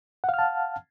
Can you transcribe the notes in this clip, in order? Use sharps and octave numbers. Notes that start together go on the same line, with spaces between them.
F5 F#5 A5 F6